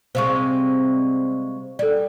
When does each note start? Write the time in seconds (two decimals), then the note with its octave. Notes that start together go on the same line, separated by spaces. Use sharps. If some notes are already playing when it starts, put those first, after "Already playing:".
0.15 C3 G3 G#3 C5 F5 C#6
1.79 G3 A4 D5